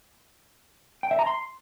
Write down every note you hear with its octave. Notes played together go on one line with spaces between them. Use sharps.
G5
E5
A#5
C6